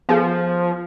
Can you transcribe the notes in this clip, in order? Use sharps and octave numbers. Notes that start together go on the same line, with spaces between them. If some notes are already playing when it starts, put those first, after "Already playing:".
F3 B3 G#4 A4